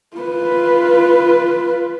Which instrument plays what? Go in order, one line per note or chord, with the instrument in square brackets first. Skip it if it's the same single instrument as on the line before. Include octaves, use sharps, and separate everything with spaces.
[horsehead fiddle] F4 B4